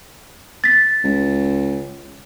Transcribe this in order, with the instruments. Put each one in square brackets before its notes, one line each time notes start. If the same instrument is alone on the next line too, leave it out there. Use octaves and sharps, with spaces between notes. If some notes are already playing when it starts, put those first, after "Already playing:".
[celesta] A6 B6
[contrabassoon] C#2